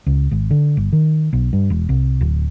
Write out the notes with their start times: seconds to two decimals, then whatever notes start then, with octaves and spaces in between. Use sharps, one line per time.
0.06 C#2
0.31 G#1
0.51 D3
0.77 G1
0.93 D#3
1.33 B1
1.53 G2
1.70 E1
1.89 C2
2.21 D1